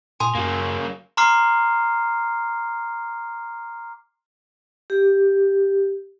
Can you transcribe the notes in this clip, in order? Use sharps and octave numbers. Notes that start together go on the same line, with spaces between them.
A#2 G#5 C6 D#6
F#2 F#3 A#3
A#5 C6 D6 F6 C7
G4